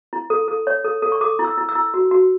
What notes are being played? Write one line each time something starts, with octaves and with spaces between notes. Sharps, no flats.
E4
A4
A4
C#5
A4
A4
C#6
A4 D6
E4
E6
E4
E6
E4
F#4
F#4